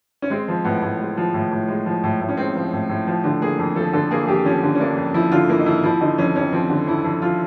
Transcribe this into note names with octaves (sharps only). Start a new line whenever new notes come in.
C#4
G#3 C4
F3
A2 B3
A2
G#3
F3
A2
A2
G#3
F3
A2
A2
C#4
G#3 C4
F3
A2
A2
F3
D3
A#3 G#4
F2
F3 A4
D3 A4
A#3 G#4
G#4
F2 G4
F3 C#4
D3
C#4
A#3 D4
F2
F3 E4
D3 F4
A#3 E4
D#4
F2 E4
F3 E4
D3 D#4
F2 C#4
F2 C#4
F3 C4
D3
F2 E4
F2
F3 F4